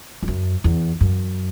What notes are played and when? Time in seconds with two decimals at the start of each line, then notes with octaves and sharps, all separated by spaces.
0.23 E2
0.28 F#2
0.64 E2
1.01 F#2